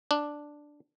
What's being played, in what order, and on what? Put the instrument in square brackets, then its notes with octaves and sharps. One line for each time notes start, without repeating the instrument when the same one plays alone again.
[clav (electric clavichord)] D4